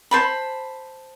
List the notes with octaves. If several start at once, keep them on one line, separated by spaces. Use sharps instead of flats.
C5 A5 B5